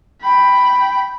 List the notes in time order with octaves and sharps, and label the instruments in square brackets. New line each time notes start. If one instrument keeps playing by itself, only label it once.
[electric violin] G5 B5